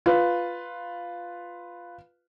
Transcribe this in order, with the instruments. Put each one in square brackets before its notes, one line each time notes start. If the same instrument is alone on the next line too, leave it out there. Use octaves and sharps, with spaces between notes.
[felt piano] F4 B4